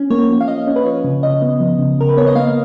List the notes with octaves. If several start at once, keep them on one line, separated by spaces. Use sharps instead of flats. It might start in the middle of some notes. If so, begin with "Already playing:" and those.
Already playing: C#4
A#3 C#5
F3
F5
F3 D#5
C#4
B4
F3 C#5
C#3
C#3 D#5
B3
F3
C#3
C#3 A#4
B4
B3 C#5
D#5
A#3 F5